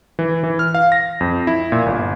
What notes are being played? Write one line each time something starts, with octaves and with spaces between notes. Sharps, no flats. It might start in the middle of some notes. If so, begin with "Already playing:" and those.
E3
E3
F6
F5
A#6
F2
E4
A#2
G1